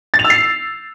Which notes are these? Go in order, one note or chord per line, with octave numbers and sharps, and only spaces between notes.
A6
F7
E6
C7